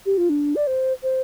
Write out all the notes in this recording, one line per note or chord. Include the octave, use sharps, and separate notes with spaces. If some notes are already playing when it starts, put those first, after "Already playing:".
G4
F4
D4
D5
C5
C5